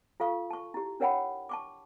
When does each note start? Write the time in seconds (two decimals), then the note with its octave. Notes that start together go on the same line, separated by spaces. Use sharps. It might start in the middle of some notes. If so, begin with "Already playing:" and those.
0.20 F4 A4 F5 C#6
0.50 A5 C#6
0.74 E4 G4
1.00 D4 A#4 C#5 F#5 G5 B5
1.49 A5 C#6 D6